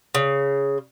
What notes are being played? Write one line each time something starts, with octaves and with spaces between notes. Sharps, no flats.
C#3